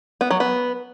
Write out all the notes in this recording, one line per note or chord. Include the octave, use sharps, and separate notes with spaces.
B3
F#3
B3